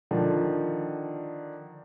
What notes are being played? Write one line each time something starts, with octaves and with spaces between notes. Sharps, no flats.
D3 D#3 F3